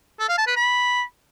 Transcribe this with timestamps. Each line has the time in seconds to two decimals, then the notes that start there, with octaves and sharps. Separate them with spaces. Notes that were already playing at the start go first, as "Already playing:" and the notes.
0.20 A4
0.29 F5
0.38 A5
0.47 B4
0.56 B5